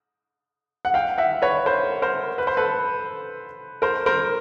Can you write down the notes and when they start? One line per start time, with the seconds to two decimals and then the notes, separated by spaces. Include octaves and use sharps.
0.85 F#5
0.94 F5 G5
1.18 E5 F#5
1.42 B4 C#5
1.66 A#4 C5
2.02 A#4 C5
2.38 B4
2.47 C5
2.57 A4 B4
3.82 A#4 C5
4.06 A#4 C5